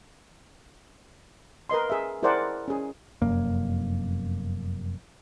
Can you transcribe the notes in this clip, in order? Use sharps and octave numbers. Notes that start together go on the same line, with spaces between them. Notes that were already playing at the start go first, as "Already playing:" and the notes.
A#4 B4 D#5 C6
G#4 E5
E4 G#4 A#4 C5 D5 F#5
C#4 G#4
F1 F#2 A#3